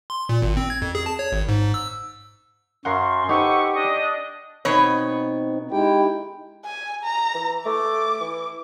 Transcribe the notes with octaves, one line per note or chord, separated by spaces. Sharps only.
C6
A#2
G#1
C4
G#6
F2
G#4
A5
C#5
G#1
G#2
E6
F#2 A#4 F5 F#5 C6 C#6
D#4 G4 A4 B4 C5 F#5 G#5 C#6
D4 D#5
B2 B3 C4 D#4 C#5
G#3 D#4 E4 G4 G5
G#5
A#5
E3
A3 D6
E3